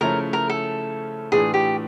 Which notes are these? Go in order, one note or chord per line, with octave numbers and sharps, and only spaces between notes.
C#3 F3 A3 C#4 E4 A#4
A#4
A4
A2 E3 A3 D4 F4 G#4
G4